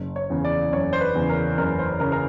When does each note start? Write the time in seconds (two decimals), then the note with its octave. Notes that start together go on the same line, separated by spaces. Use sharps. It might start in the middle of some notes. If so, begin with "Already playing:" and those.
Already playing: F#1
0.16 C#5
0.30 E2 C#3
0.45 D5
0.73 F#1 C#5
0.93 C5
1.01 B4
1.15 E2 C#3
1.29 A#4
1.58 F#1 A#4
1.79 C5
2.00 C#3 A#4
2.12 A#4